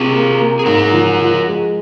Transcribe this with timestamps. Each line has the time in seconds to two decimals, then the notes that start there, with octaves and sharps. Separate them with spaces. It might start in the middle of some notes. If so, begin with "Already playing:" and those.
Already playing: C3 F4 G#4
0.12 A#3
0.38 A#3
0.59 G#4
0.66 G#2 F#4 A#4
0.93 F3
1.21 F3
1.47 G#3